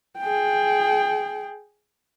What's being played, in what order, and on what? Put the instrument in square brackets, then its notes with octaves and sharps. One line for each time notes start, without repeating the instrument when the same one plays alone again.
[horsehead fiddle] G#4 G5